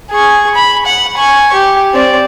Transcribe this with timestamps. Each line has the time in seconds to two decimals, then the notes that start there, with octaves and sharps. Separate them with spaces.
0.11 G#4 C#6
0.55 B5
0.86 F#5
1.17 G#5 C#6
1.53 G4
1.94 C4 D5